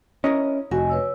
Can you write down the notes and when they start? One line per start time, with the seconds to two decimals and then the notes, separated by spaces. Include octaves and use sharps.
0.24 C#4 E4 A#4 D#5
0.71 F1 F#4 D#5 G#5
0.89 B4 C#5 E6